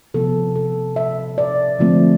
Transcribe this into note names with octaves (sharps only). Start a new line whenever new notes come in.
C3 F3 B3 A4
A4
E5
D5
D3 F3 A3 C4